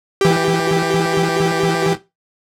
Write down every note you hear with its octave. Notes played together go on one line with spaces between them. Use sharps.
E3 G4